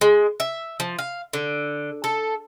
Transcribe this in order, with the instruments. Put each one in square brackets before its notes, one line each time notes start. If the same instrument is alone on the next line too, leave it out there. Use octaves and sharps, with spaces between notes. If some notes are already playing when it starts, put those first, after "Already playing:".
[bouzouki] G#3
E5
F3
F5
D3
A4